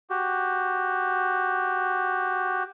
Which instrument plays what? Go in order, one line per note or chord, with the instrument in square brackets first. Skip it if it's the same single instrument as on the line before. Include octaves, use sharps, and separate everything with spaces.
[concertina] F#4 G4